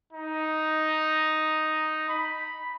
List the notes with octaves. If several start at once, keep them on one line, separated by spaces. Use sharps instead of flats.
D#4
B5